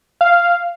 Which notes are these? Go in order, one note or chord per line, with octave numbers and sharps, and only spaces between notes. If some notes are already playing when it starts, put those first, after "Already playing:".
F5